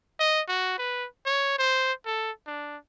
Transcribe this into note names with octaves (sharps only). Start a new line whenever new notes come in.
D#5
F#4
B4
C#5
C5
A4
D4